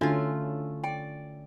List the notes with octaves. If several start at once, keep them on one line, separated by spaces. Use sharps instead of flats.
D3 A3 C#4 D4 F4 F#4 F5
D5 G5